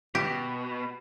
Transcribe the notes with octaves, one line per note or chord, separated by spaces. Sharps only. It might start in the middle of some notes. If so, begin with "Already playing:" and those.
B2 G4